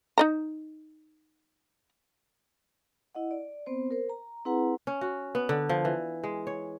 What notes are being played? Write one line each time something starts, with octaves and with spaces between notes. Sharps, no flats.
D#4 D#5 A#5
E4 D#5 F#5
D5
B3 C4 C5
A#4 C5
A#5
C4 E4 G#4 B4 F#5 A#5
C#4
F#4
B3
D3
F3
E3
G#3
C#5